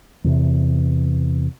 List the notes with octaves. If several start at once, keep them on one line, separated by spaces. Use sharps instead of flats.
E2 C3